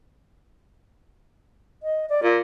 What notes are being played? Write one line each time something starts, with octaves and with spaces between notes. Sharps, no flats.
D#5
D5
A#2 F4